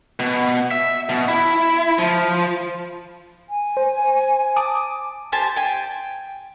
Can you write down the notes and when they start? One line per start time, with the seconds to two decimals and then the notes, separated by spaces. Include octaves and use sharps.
0.20 B2
0.71 E5
1.09 B2
1.28 E4
1.98 F3
3.50 G#5
3.77 C5
4.56 A5 D6 D#6
5.32 G4 C5 G#5 A5
5.56 G5 G#5